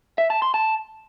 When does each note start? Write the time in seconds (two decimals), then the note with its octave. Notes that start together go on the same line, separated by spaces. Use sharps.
0.18 E5
0.30 A5
0.42 C6
0.54 A5